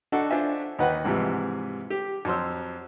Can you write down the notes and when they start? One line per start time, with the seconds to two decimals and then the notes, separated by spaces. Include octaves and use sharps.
0.12 D4 D#4 F#4 A4
0.30 D4 F4 F#4 C5 E5 G#5
0.79 D#2 D#4 F#4 B4 F#5 G5
1.05 G#2 C3 E3 F3 G3
1.90 G4
2.25 F2 F#3 C5 C6 E6